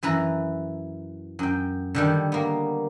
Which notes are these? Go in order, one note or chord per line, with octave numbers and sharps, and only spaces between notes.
F#2 E3 B4 A#5
F#2 G5
D3 D#3 G3
A#3 B3